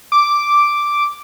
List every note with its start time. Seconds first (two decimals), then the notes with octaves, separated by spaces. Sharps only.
0.12 D6